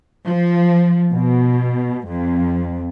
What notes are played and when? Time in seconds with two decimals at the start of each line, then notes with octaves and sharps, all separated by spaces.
0.25 F3
1.13 B2
2.08 F2